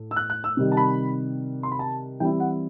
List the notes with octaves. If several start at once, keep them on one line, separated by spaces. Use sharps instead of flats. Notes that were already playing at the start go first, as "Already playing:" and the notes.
Already playing: A2
E6
F#6
F#6
E6
C3 D#3 G3
A5
B5
C6
B5
A5
E3 G3 C4 E4 G5
F#5